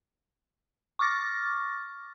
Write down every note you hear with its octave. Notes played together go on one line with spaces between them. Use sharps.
C#6 D6 F6 A6 A#6